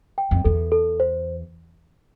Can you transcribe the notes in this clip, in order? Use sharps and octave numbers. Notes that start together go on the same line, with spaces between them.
G5
F2
E2 A4
A4
C5